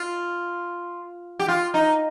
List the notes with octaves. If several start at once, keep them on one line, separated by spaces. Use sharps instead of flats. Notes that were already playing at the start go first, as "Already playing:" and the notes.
Already playing: F4
G4
F4
D#4